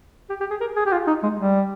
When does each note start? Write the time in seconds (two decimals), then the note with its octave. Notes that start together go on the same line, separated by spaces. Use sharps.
0.30 G4
0.40 G4
0.51 G#4
0.61 A#4
0.76 G#4
0.86 G4
0.92 F4
1.07 D#4
1.23 G#3
1.38 G3